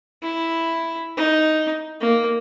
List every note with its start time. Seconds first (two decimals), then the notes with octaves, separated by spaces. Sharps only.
0.23 E4
1.17 D#4
2.01 A#3